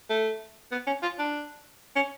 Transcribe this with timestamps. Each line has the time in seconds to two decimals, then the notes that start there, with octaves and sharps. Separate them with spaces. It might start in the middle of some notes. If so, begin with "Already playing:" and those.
0.10 A3
0.72 B3
0.87 C#4
1.03 F4
1.19 D4
1.96 C#4